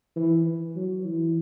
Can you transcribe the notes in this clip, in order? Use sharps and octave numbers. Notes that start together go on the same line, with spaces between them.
E3
F#3
E3